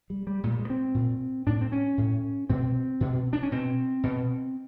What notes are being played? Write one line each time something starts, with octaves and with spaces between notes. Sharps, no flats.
G3
G3
A#2 G#3
G3
G#3
C4
A#2
A2 D4
C4
C#4
A2
B2 C4
B2
D4
C#4
B2 C4
B2